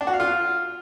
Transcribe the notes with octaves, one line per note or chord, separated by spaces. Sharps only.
D4
F#4
F5
F4